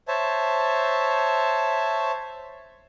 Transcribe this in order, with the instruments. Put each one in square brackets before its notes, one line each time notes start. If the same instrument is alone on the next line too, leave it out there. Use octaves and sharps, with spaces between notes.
[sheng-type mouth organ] C5 C#5 E5 A5